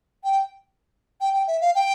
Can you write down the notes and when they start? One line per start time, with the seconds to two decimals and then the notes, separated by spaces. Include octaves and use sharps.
0.24 G5
1.21 G5
1.34 G5
1.48 E5
1.61 F5
1.75 G5